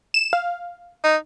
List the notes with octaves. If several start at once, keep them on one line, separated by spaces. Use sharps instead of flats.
E7
F5
D#4